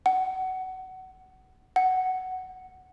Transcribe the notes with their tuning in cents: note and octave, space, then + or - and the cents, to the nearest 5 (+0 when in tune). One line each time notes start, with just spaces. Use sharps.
F#5 +20
F#5 +5